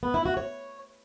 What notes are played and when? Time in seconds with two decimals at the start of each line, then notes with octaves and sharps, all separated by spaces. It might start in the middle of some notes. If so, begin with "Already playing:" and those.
0.03 B3
0.14 E4
0.26 F#4
0.37 C#5